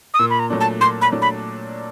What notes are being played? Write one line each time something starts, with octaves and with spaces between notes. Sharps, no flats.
D#6
A#2 E6
B5
A#5
F#3 A3 D4
A5
A#2 C6
B5
F#3 A3 D4
B5